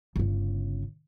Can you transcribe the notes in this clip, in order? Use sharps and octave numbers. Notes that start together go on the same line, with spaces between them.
G1 C#3